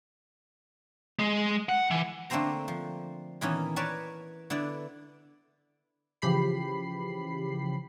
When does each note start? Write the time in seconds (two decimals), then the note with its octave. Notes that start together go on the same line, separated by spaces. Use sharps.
1.19 G#3
1.69 F#5
1.91 E3
2.30 D3 A3 A#3 C4 C5 A#5
2.68 F3
3.41 A#2 D#3 E3 B3 C#4 D#4
3.76 A#4 B4 C#5 D5 G#5 A5
4.50 D3 B3 E4 D5
6.22 C#3 E3 F3 G4 B5 C7